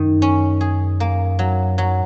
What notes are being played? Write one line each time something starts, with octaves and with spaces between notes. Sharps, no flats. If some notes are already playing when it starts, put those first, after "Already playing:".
Already playing: F#2 D#3
C#4
G#4
A#3
F#3
F#3